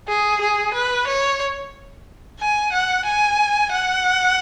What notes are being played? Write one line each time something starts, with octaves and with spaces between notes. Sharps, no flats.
G#4
G#4
B4
C#5
G#5
F#5
G#5
F#5